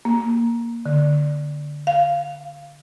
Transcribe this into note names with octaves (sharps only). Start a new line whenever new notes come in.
A#3
D3
F5